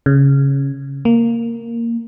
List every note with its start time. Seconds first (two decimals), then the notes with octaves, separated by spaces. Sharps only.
0.06 C#3
1.05 A#3